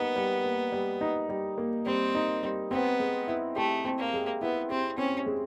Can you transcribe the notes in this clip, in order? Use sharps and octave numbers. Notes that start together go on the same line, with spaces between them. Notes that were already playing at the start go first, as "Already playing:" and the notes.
Already playing: G3 A#3 B3 D#4
G3
A#3
G3
D#4
G3
A#3
G3 C4
D#4
G3
B3 C4
G#3
E4
A3 G4
C4
A#3
G#3
B3 E4
C4 G4
C4 C#4
G#3